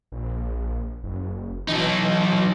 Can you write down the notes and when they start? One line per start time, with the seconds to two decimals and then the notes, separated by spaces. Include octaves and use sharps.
0.12 A#1
1.03 F#1
1.69 E3 F#3 D#4